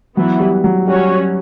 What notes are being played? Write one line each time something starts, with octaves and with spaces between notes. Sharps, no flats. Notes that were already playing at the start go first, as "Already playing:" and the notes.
E3 F#3 B3 E4
G3
F#3
G3 C#4 F#4 C#5